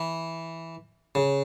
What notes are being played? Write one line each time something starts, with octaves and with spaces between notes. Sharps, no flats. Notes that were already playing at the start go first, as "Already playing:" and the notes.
Already playing: E3
C#3